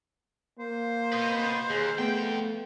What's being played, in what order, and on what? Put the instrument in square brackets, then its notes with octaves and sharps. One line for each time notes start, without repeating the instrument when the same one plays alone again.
[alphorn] A#3 [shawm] C5
[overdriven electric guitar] B4 D#5
[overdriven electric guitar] D#2 [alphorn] G#4
[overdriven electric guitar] F2 G5 [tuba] A3 [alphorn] B3